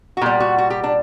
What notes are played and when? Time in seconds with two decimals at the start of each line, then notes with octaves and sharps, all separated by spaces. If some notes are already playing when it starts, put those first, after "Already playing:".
0.17 F#4
0.21 A#2 G3 G4
0.40 F#4
0.58 F#4
0.70 G4
0.83 D4